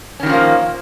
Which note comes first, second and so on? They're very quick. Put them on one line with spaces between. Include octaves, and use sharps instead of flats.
C#4 D#3 G3 F3 A#3